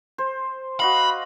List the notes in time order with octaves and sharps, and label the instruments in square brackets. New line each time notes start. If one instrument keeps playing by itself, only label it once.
[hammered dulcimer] C5
[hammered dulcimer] F#4 D#5 F5 [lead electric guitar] B5